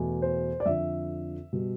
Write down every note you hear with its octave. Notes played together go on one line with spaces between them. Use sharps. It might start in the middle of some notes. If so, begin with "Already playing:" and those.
Already playing: E2 B2 A3
C5
D5
F2 D3 F3 E5
B2 G3